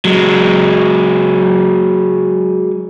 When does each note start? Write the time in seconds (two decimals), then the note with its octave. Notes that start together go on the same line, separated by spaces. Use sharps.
0.05 F#3 G#3